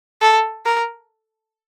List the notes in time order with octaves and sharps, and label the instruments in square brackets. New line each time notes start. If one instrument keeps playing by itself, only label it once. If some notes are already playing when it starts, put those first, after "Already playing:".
[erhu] A4
A#4